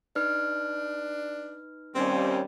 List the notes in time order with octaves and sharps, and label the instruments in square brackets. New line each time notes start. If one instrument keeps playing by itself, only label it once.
[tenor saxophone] D4 [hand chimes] D#4 B4 F6
[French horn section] D#2 G3 [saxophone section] C4 C#4